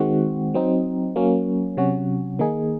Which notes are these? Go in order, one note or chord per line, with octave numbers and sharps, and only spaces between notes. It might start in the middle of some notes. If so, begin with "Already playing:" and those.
Already playing: D#3 G#3 C4 F#4
F#3 C4 D#4
F#3 A#3 C#4
C3 F#3 C#4 F#4
D#3 A#3 D#4 G#4